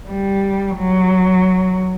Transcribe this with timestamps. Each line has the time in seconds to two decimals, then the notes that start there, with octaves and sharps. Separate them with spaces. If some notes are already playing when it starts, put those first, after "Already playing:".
0.08 G3
0.76 F#3